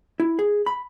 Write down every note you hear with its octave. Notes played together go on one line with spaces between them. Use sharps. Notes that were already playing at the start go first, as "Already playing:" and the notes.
E4
G#4
B5